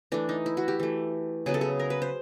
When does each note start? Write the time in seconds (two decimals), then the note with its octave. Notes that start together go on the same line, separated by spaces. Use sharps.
0.12 E3 A3 D4
0.29 D#4
0.46 E4
0.57 F#4
0.68 G4
0.80 E3 A3
1.46 C#3 F#3 B3 G#4
1.54 A4
1.61 G#4
1.80 A#4
1.90 B4
2.02 C5